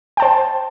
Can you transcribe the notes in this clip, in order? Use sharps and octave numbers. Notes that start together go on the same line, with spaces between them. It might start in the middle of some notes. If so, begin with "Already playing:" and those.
C5 G5 A5